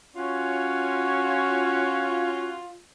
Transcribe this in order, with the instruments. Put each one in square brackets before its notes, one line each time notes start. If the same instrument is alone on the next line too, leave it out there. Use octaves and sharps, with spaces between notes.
[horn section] C#4 F#4 C#5 [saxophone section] F4